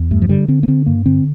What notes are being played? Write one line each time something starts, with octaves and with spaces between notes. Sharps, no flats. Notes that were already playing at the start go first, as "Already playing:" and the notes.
Already playing: E2
G2 A3
F3
D3 G3
D3 C4
A#3
D3 C4
G2 A#3
D3 C4